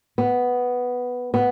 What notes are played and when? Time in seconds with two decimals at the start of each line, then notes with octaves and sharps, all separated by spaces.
0.18 B3
1.34 B3